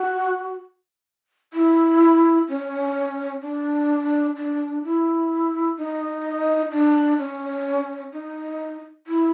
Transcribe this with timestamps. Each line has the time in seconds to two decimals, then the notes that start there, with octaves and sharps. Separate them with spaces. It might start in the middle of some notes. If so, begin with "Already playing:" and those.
Already playing: F#4
1.53 E4
2.48 C#4
3.42 D4
4.36 D4
4.83 E4
5.77 D#4
6.71 D4
7.18 C#4
8.12 D#4
9.07 E4